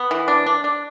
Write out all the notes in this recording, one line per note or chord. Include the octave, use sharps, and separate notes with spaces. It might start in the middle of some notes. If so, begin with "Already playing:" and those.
Already playing: B3
E3
D4
D4
D4